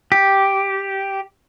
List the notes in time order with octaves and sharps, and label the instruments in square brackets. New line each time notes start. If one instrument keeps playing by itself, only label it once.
[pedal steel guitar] G4